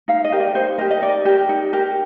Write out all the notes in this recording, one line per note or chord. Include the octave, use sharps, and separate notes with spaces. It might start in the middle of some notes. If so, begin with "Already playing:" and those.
D#4 F5
D#5
G4 A#4
D5
D#4 C5
G4 A#4 D#5
D#5
D#4 D5
G4 A#4
D#4
G4 A#4